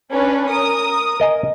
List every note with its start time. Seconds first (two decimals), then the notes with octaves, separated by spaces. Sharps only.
0.12 C#4 D4 B4
0.48 A#4 D#6
1.20 A#4 D#5 G#5